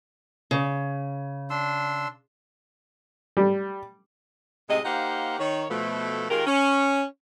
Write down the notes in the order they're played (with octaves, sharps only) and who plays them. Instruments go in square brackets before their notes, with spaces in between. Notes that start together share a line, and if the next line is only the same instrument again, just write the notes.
[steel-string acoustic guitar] C#3
[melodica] D4 C6 E6
[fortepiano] G3
[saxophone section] A2 C3 G#3 G#4 D#5
A#3 D#4 G4 C5 F5 F#5
D#3 C#5
B2 F3 A3
D#3 G#3 F4 G4 A#4
C#4